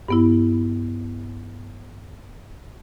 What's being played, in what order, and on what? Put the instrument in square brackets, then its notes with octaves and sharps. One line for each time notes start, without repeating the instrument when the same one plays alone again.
[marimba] G2 B3 E4